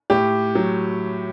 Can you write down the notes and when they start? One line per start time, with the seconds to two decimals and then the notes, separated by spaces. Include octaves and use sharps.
0.10 A2 G4
0.55 F#3